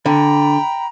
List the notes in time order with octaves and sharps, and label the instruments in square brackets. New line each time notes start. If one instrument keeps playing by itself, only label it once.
[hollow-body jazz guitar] D3 [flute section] G5 A#5 B5